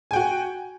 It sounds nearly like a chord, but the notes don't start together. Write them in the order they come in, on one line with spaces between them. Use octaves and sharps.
G#5 G5 F#4